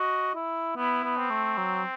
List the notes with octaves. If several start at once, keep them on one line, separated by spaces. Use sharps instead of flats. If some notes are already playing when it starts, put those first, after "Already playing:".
Already playing: F#4 D#5
E4
B3 E4
B3
C4
A3
F#3